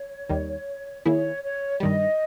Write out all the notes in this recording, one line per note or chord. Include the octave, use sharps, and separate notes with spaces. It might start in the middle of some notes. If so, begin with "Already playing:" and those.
Already playing: C#5
D#2 D#3 G3
D#3 A#3 E4 G#4 C#5
C#5
G2 D#3 G3 D#5